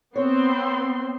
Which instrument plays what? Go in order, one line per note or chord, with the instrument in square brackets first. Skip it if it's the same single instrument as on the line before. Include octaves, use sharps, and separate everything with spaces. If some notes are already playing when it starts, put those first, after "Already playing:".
[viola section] B3 C4 C6 [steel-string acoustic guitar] C#5